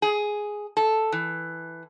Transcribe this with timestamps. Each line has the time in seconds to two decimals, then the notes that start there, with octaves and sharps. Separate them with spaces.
0.02 G#4
0.77 A4
1.12 E3